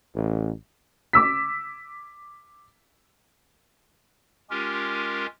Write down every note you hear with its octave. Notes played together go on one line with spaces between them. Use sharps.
A1
D6 E6 B6
G#3 C#4 F4 G4 A#4